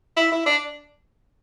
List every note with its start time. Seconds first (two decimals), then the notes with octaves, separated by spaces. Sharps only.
0.17 E4
0.32 E4
0.46 D4